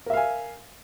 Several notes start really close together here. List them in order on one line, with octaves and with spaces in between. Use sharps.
A#4 E5 F5 G#5